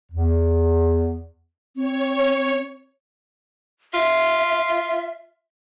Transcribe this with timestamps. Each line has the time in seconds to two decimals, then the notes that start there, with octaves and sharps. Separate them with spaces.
0.12 E2
1.75 C4 C#5
3.94 F4 E5